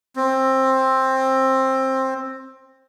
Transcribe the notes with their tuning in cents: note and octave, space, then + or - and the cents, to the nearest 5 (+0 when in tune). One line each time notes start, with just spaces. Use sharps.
C4 +15